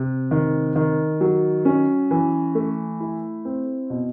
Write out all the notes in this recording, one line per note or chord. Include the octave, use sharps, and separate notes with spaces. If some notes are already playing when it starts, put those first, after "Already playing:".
Already playing: C3
D#3
D#3
F#3
C#4
E3
A3
E4
C4
B2